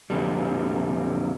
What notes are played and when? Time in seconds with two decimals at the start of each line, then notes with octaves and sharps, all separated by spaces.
0.10 F2 A#2 D3 G3